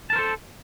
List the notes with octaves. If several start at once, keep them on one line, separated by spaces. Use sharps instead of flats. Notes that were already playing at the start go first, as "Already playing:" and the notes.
A4 A#4 C5 A5